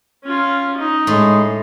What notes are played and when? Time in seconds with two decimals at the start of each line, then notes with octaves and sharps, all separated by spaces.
0.25 C#4 F4
0.78 D#4
1.07 A2 G#3